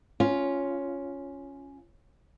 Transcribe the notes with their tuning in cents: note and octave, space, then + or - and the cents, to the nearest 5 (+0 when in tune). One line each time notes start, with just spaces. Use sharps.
C#4 +5 F4 +0